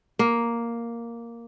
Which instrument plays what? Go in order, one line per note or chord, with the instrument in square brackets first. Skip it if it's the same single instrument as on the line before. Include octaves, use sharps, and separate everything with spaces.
[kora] A#3